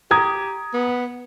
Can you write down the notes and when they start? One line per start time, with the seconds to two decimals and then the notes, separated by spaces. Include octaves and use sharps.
0.11 G4 A#5 D#6 G#6
0.74 B3